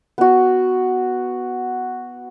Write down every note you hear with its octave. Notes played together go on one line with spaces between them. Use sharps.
B3 F#4